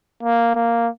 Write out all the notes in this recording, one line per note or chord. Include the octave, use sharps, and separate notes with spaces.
A#3
A#3